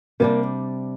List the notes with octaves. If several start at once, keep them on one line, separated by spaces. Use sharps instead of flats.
C3 G3 A#3 D4